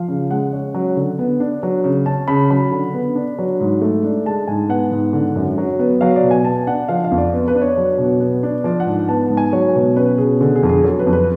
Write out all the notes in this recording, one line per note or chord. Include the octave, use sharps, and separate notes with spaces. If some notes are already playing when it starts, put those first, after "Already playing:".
Already playing: F3 F5
C#3
G#3 F#5
C#4
F#3
D3
B3
D4
F#3
C#3
C#4 A5
C#3 B5
F#3 B5
D3
B3
D4
F#3
G#2
A3
D4
G#3 A5
G#2 G#5
B3 F#5
G#2
D3
F#2
F#3
B3
F#3 F5
D5
B2
G#5
B3 A5
D4 F#5
F3 F5
F5
F2
D5
B3
B4
D4
C#5
F#3
B2
B3
D4
F3 D5
F#5
G#2
B3 A5
G#2
G#5
F#3 C#5
B2
C#4 B4
B2 G#4
D3 G#4
G#4
F2
G#4
F#3 A4
B4
F2
B4